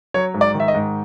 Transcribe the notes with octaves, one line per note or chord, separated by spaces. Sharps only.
F#3 C#5
G#2
D5
D#3
E5
D#5
G#2